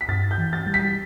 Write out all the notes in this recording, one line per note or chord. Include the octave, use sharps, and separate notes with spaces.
B6
G2 A6
G6
E3
A6
G3
B6